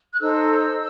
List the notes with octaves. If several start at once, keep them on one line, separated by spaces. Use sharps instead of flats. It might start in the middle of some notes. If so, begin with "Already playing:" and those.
F#6
D#4 A4 C5 E6